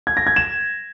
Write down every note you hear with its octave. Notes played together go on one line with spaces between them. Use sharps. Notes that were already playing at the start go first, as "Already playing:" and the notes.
G#6
A#6
G#6
E7